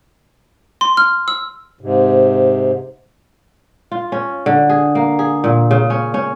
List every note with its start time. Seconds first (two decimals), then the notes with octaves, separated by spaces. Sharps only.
0.81 C6
0.97 F6
1.28 E6
1.81 G#2 C3
3.92 F4
4.12 C#4
4.46 D3
4.69 G#4
4.95 A#3
5.19 G#4
5.44 A#2
5.71 C#3
5.90 C#4
6.14 C#4